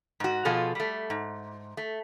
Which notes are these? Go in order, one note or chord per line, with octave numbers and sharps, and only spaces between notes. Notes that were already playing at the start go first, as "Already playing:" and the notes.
G#2 F#4
B2 F3 F4 G#4 A4
G3 A3
G#2
A3